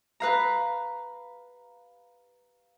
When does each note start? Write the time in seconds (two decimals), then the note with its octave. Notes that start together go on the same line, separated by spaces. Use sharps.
0.20 B4 F5 A#5